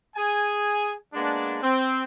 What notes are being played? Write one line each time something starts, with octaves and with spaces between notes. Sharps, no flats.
G#4 G#5
G#3 A#3 B3 D4
C4